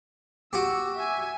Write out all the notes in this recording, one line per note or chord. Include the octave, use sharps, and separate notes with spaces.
F#4 G4 E6
E5 G#5